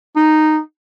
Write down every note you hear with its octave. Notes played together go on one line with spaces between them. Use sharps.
D#4